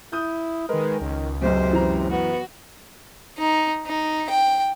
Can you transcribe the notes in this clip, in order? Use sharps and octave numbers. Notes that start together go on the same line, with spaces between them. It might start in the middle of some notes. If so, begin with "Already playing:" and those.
E4 D#6 G6
D#3 G#3 A#4 B4
C#2 D#3
B1 F#2 C3 C5
F#2 E3 A#5
B3 F#4
D#4
D#4
G5